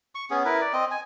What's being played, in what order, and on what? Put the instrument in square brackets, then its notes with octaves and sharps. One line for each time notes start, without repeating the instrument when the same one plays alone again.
[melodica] C#6
B3 C#4 G#4
E4 A#4 B4
D5
C4 D#5
G#5